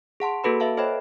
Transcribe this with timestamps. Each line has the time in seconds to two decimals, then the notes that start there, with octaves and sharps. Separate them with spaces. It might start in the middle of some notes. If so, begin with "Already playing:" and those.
0.20 G#4 F#5 A5 C6
0.44 A#3 F#4 A4 B4 B5
0.60 B4 E5 F5 A5
0.77 A4 C5 C#5 D#5 G5 B5